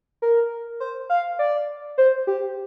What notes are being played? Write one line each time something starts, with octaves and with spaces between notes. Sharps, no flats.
A#4
C5
F5
D5
C5
G4